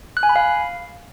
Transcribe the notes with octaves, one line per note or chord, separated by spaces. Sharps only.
F#6
G#5
B5
F5